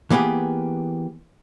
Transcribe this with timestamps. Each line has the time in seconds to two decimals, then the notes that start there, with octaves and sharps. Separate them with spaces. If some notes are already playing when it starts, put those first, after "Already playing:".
0.10 E3 A#3 B3 G4 G#4